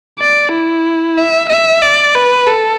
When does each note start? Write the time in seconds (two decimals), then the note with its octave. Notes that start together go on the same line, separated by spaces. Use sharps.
0.20 D5
0.52 E4
1.17 E5
1.49 E5
1.82 D5
2.15 B4
2.47 A4